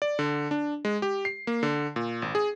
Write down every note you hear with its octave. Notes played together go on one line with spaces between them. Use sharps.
D5
D3
D4
G#3
G4
C7
A#3
D3
A#2
G#1
G#4